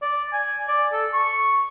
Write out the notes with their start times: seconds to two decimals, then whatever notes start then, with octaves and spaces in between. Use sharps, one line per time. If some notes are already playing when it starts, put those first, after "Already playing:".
0.02 D5
0.32 G#5
0.68 D5
0.93 A4
1.13 C#6